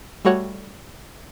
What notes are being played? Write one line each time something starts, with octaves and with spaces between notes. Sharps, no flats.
G3 A3 F#4 C#5 F#5